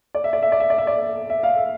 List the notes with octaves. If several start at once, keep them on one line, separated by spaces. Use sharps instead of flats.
D5
E5
D5
E5
D5
E5
D5
E5
D5
E5
F5
E5